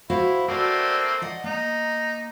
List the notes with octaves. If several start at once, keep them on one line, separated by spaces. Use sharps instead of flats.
E4 F#4 C5 F5
A3 A#3 C4 F#4 D5
D5 D#5 F#5
A#3 D#4